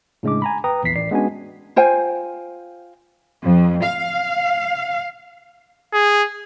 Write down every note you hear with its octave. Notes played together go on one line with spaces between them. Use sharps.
A2 C#3 G#3 D4 D6
G#5 A#5 B5
B4 G5 A#5 D#6
A#1 E2 E3 B6 C7
A1 D5 C7
G#3 B3 C#4 D4 F#4 G#5
F4 C5 G5 G#5
F2
F5
G#4